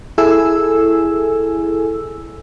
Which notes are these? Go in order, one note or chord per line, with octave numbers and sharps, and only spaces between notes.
E4 G#4 A4 G#5 E6